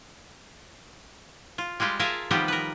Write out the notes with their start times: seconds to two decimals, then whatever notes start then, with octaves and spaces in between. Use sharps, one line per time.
1.58 F4
1.80 G3 G#3 F4 G4
2.00 F4 G#4 A#4 E5 F5 A5
2.31 D#3 F3 G3 B3 C4 G4
2.48 A#4 B4